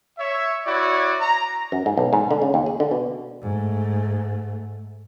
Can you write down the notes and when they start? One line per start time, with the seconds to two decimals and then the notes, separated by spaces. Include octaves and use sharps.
0.18 C#5 E5
0.65 E4 F#4 C#5 D5
1.21 A#5
1.72 F#2
1.86 G#2
1.97 B1
2.13 G#2
2.31 D3
2.42 C#3
2.54 D#2
2.66 G#4
2.80 D3
2.91 B2
3.42 G#2 A3